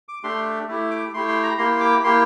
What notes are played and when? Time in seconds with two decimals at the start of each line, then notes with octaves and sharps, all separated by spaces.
0.09 D6
0.23 A3 D4 G4 C6
0.68 A3 E4 G4
0.91 D6
1.14 A3 E4 G4 C6
1.28 C6
1.43 A#5
1.58 A#3 E4 G4 C6
1.72 C6
1.81 D6
2.04 A#3 E4 G4 C6